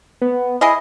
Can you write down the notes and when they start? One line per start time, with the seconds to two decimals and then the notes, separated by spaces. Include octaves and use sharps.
0.21 B3
0.61 E4 G#4 D#5